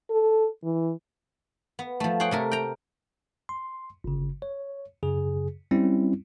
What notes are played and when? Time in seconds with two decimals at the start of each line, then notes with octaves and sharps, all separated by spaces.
0.10 A4
0.64 E3
1.79 B3
2.00 F3 A3
2.20 G#4 C5 C#5 F#5 G5
2.31 C3 A3 A#4
2.51 G5 A#5
3.49 C6
4.04 G1 C#3
4.42 C#5
5.03 F#2 C#3 G#4
5.71 G3 C4 C#4 E4